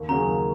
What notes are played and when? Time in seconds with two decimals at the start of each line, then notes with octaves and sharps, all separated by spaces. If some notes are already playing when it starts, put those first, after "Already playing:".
Already playing: D#2
0.08 C#3 F#3 C#4 G#4 A#5
0.27 D#2